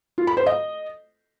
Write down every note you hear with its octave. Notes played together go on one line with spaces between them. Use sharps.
F4
B5
C5
D#5